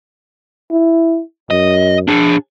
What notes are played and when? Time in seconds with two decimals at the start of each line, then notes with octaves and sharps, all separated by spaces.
0.71 E4
1.51 F#2 D#5
2.08 D4 G#4